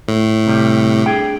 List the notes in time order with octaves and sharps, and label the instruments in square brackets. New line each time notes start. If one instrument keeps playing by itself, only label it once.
[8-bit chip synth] A2
[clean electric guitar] C3 G3 G4
D4 G#4 G5